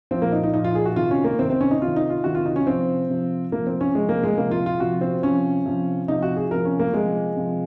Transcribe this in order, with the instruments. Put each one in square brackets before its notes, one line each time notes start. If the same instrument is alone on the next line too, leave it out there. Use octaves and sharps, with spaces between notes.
[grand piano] A#2 F3 C4
A#3
D#4
D#4
A#2 F3 D#4
F4
G#4
F#4
C3 D#3 F4
C#4
A#3
C3 C4
D#3
C4
C#4
D#4
C3 D#3 F4
D#4
F4
C3 D#3 F#4
F4
D#4
C#4
C3 F3 C4
C3 F3
C3 F3 A#3
C4
C#4
C3 F3 G#3
A#3
G#3
C3 F3 A#3
F4
F4
C3 F3 F#4
C4
C3 F3 C#4
C3 F3
C3 F3 D#4
F#4
G#4
C3 F3 A#4
C#4
A#3
C3 F3 G#3
C3 F3